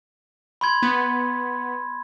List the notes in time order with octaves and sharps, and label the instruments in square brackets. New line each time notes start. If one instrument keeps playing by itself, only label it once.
[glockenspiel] B5 C6 G#6
[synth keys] B3